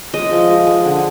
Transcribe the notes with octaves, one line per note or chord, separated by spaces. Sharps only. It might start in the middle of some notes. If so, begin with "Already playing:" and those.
G#3 D#5
F3
G#3
G#3
D3